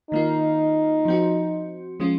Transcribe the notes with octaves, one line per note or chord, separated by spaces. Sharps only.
D#3 A#3 D#4 F4
F3 C4 F#4
F3 G#3 C#4 F4